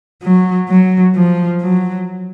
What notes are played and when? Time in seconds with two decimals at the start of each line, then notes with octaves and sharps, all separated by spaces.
0.22 F#3
0.69 F#3
1.15 F3
1.61 F#3